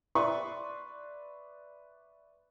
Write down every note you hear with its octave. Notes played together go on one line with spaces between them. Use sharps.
B4 D5 E5 C6 C#6